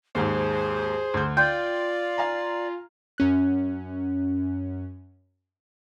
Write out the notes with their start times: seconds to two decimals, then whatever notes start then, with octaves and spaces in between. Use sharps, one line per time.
0.15 D#2 G#2 G#4 C5
1.14 D2 G6
1.37 F4 D5 G5 C6 G6
2.18 F5 G#5 A#5
3.18 F#2 C#4 F#6